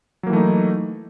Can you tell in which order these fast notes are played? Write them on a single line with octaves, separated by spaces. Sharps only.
F#3 A#3 E3 A3 D#4